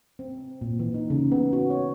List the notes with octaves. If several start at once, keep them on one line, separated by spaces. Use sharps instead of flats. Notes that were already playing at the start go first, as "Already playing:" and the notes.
C4
A#2
E3
D#4
C#3
B3
F#4
C#5